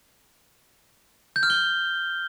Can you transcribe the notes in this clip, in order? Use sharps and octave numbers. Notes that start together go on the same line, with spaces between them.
G6
F6
G7